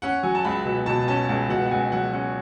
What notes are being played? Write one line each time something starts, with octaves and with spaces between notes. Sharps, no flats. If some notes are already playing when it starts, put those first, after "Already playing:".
C#4 F#5
F#3 G#5
A5
C#2 B5
B2
B2 A5
C#4 A5
C#2 A5
B2 F#5
F#5
C#2 G#5
F#3 F#5
C#4 F#5